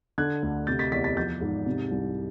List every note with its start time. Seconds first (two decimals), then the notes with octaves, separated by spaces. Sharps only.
0.18 D3 F#6 G#6
0.43 D2
0.67 C3 G6 A6
0.79 A6 B6
0.92 E2 A6 B6
1.04 A6 B6
1.17 F3 G6 A6
1.41 G#2
1.66 C3
1.91 C2